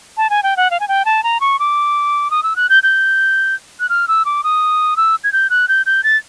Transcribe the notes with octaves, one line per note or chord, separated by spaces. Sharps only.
A5
G#5
G5
F#5
F5
G#5
G5
A5
A#5
C#6
D6
D#6
E6
F#6
G6
G6
F#6
F6
E6
D6
D#6
E6
G#6
G6
F#6
G6
G6
A6